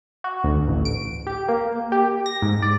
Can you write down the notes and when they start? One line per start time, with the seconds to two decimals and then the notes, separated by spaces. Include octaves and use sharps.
0.24 F#4
0.44 D2
0.67 A1
0.85 D7
1.27 G4
1.48 A#3
1.92 G4
2.26 A#6
2.42 G#2
2.62 D5